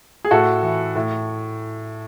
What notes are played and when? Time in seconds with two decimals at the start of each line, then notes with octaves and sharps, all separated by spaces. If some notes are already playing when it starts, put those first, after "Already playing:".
0.25 G#4
0.31 A2 F#4 A4
0.63 E3
0.96 A2